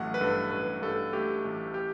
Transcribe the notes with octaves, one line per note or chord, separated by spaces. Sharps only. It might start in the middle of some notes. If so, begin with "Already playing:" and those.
Already playing: A1 F#3 A3 F#5
B4
G2 A4
A1 B4
G2 A4
A3 G4
A1
G4